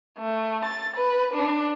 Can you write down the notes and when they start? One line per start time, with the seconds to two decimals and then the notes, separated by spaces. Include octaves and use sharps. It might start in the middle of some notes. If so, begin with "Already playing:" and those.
0.18 A3
0.65 A6
0.97 B4
1.34 D4